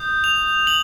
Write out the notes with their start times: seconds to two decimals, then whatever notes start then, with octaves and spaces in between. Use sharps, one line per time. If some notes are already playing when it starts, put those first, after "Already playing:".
Already playing: D#6 G6
0.24 F7
0.67 F#7